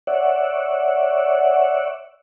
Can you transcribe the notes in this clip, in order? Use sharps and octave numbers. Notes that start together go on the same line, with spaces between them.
C#5 D5 E5 F#5